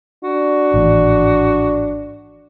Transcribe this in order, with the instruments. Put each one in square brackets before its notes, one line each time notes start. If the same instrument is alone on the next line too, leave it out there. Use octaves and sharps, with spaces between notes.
[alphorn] D4 [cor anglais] F#4
[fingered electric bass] G#1 A2 E3